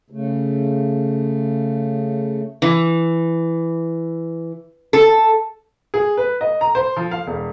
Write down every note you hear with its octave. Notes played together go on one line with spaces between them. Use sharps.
C#3 A3
E3
A4
G#4
B4
D#5
A#5
C5
F3
F5
E1